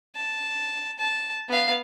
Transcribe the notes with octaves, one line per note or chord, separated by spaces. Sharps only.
A5
A5
B3 F5